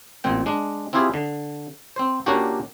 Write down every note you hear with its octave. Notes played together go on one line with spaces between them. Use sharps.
A1 A#2 C4 G5
G#3 D4
C4 E4 F4 G4 G#4
D3
C4 C5
A#2 A#3 C#4 D4 F#4 G4